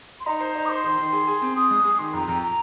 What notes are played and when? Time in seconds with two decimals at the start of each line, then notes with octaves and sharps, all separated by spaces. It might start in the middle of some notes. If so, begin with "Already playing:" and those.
0.20 C6
0.26 D#4 A#5
0.40 C5
0.55 D#4
0.66 D#6
0.69 C5 C6
0.84 D#3
0.98 D#3
1.13 G#4
1.27 G#4
1.42 C4
1.56 G#4 D#6
1.71 G#3
1.84 G#4
1.99 D#3 C6
2.14 F2 A#5
2.28 F2 A#5
2.43 A#5